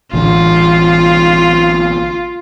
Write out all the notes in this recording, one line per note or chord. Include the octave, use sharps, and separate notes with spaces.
A1 D3 F4